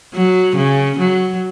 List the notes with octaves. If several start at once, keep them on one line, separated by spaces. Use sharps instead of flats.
F#3
C#3
F#3